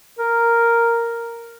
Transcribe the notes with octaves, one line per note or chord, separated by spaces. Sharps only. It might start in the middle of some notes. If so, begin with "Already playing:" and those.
A#4